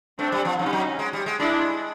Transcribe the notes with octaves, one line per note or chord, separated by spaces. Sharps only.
A3 C4 D4
G3
F3
F3 C#4 D#4
G3
F#3
G#3
G3
G#3
G#3 D4 E4